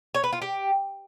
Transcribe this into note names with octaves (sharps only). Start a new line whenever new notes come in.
C#5
B4
F4
G4